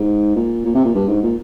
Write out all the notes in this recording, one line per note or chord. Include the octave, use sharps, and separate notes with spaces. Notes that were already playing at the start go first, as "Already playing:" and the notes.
Already playing: G#2
A#2
A#2
C3
A#2
G2
G#2
A#2